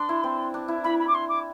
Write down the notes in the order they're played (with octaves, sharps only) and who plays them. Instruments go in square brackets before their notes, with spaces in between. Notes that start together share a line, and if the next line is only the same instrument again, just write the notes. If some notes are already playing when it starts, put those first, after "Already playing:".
Already playing: [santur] D4 [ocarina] C6
[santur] E4
C4
D4
E4
[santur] E4 [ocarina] B5
[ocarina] B5
D6
C6
D6